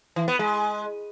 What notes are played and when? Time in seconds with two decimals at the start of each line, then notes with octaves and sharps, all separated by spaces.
0.16 E3
0.28 B3
0.39 G#3